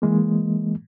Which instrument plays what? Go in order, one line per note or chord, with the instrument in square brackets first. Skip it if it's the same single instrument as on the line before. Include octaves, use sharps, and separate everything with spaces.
[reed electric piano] E3 G#3 A#3